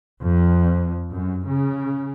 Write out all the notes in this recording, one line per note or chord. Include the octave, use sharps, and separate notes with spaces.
F2
F#2
C#3